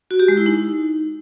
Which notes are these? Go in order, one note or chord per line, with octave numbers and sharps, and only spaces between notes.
F#4
G4
G#3
E4
D#4